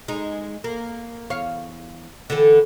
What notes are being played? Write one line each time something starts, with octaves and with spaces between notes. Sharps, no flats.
G#3 D#4
A#3
E2 C#5 F5
D3 E3 A4